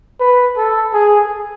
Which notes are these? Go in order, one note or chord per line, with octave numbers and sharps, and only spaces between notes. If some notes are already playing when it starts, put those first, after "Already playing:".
B4
A4
G#4